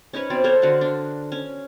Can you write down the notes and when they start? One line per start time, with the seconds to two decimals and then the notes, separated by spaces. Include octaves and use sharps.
0.13 C#4 D#4 B4 C#5
0.30 B2 C4 D5
0.44 A4 A#4 C5 C#5
0.62 D3 F#4 F5 F#5
0.81 D4
1.32 C#4